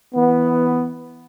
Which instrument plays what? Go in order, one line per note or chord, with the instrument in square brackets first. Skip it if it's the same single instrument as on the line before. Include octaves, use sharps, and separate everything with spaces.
[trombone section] E3 B3